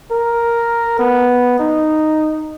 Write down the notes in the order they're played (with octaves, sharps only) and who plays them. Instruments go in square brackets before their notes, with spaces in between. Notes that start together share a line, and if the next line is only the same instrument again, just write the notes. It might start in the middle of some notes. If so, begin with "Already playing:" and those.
[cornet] A#4
B3
D#4